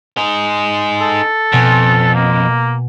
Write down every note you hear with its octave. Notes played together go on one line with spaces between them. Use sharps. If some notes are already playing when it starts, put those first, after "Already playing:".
D#4 G#4
A4
F2 B2 G#5
A#3